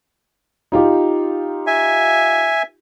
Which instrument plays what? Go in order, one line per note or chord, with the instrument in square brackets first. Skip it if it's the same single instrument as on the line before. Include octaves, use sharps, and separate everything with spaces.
[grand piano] D#4 F4 G4
[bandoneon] E5 G#5